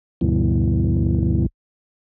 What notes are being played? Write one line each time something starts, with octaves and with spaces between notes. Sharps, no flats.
D2 G2 B2 E3